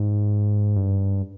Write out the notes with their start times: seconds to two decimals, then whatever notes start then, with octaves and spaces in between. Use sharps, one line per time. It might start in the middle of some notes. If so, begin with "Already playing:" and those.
Already playing: G#2
0.76 G2